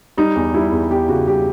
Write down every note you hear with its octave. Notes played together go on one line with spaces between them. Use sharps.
G3 D#4
E2
G3 E4
E2
E2 G4
C#3 F#4
G3 G4